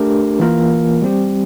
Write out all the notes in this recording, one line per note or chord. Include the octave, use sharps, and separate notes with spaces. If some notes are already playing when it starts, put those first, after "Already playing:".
Already playing: A3 D4 G4 A#4
E3 A#3 F4 A#4
G3 C4 G4